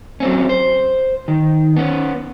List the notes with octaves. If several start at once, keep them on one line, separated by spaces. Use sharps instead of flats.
F#3 C4 C#4
C5
D#3
B3 C#4